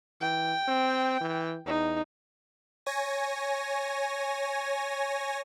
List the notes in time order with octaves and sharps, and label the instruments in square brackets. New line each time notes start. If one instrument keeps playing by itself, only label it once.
[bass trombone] E3 [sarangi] G5
[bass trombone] C4
E3
[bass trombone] E2 [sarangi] D#4
[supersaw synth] C#5 G#5 A#6